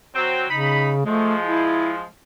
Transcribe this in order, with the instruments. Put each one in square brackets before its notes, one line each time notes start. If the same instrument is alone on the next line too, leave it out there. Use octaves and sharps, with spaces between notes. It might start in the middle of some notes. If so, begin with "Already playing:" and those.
[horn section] F#3 C4
[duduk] C#3 [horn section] D#4 B5
[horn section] F3 G#3 [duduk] A3
[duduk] E4